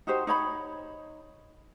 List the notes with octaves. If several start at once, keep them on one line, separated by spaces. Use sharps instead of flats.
D#4 F#4 G4 C5
D#4 C#5 B5